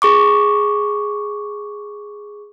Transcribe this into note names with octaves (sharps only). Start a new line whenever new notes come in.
G#4 C#6 D6